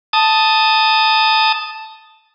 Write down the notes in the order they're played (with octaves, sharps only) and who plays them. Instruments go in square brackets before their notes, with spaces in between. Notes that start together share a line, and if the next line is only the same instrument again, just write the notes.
[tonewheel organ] A5 D#6